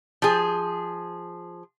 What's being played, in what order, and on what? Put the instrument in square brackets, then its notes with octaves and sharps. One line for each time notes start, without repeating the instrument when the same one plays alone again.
[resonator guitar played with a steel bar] F3 G#4